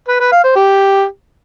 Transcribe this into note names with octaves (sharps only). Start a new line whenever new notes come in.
B4
B4
F5
C5
G4